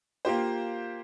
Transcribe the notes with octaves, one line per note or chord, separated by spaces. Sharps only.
A#3 F4 G4 C5